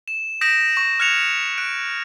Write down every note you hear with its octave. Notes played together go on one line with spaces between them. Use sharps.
E7
D#6 G6 A#6 B6 D7 E7
C#6 A#6 E7
F6 F#6 G#6 C#7 E7 F7
F#6 D7